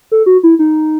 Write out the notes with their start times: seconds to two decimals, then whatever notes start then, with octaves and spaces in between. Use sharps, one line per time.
0.12 A4
0.26 F#4
0.43 E4
0.59 D#4